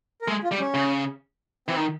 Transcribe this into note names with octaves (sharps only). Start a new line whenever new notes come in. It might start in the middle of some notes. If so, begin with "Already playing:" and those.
A#4
G#3 A3 A4
F4
G3
C#4
C#3
E3 C4
D#3